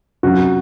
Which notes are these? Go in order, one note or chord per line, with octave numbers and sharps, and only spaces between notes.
C3 F#3 C#4 F4 F#4